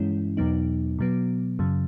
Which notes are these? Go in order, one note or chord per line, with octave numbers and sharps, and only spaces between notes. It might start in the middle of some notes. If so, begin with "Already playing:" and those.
Already playing: G2 E3 G#3 C#4 E4
E2 B2 F#3 B3 D#4
B2 F#3 B3
F#2 C#3 F#3